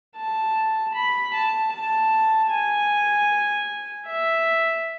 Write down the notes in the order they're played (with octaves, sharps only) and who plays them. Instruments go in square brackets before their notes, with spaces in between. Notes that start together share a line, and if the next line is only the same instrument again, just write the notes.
[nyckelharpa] A5
B5
A5
A5
G#5
E5